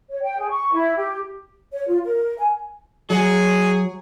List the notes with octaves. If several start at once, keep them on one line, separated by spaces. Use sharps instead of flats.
C#5
G5
G#4
C#6
E4
G4
C#5
F4
A#4
G#5
F#3 G#4